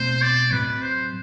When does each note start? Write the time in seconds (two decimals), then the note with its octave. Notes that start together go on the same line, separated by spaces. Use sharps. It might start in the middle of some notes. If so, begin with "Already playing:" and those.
Already playing: B2 A3 C4 C5
0.22 D5
0.52 A2 F#3 C4 B4
0.82 C5